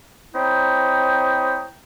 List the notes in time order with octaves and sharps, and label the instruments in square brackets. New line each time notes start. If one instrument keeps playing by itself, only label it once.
[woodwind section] C4 E4 C#5 D#5 G5 A#5